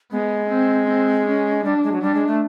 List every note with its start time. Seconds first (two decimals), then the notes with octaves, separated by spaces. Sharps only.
0.11 G#3 B3
0.49 C4
0.88 C4
1.26 C#4
1.64 G3 D4
1.83 G#3
1.92 F#3
2.02 G3 D4
2.15 G#3
2.27 A3